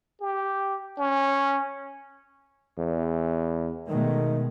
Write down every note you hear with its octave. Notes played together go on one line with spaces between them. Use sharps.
G4
C#4
E2
B2 D#3 G#3 A3